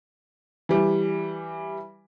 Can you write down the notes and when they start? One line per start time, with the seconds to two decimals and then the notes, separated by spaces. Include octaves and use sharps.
0.69 E3 G3